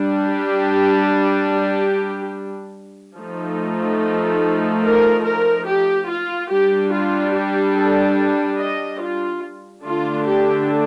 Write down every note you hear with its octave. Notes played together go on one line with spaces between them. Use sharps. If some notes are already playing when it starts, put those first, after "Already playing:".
Already playing: G3 D4
G4
G4
F3 A3 D#4
A#4
A#4
G4
F4
G3 D4 G4
F4
G4
A4
D#5
F4
D3 A3 D4 F4
G4